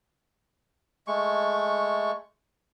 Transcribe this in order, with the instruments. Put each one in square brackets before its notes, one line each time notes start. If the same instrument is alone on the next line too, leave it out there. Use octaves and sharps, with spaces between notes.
[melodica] G#3 A3 C#6